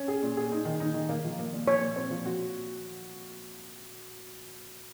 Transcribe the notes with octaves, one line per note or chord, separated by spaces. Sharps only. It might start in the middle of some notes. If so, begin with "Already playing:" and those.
Already playing: C#4
G#4
A#2
G#4
D#4
D#3
D#4
D#3
A#3
F3
A#3
A#2
F3 C#5
A#2
C4
F3
F#4